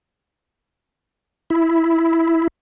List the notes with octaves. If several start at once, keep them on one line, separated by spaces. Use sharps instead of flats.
E4